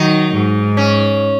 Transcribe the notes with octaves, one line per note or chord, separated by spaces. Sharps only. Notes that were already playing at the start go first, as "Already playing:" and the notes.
Already playing: D#3 F#3 D#4
G#2
C#4